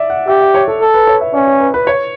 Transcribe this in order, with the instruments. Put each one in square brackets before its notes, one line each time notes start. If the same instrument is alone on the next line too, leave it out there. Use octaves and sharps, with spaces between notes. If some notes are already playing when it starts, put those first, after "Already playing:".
Already playing: [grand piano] D5 E5
F#5
[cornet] G4 [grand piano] E5
[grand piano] E5
C#5
A4
[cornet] A4
[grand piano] B4
C#5
E5
[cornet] C#4 [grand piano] D5
[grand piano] C#5
B4
B4
C#5